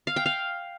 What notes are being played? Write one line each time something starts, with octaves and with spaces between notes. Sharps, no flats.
F5
G5
F5